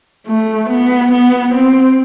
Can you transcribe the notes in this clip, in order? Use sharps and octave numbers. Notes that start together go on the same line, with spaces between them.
A3
B3
B3
C4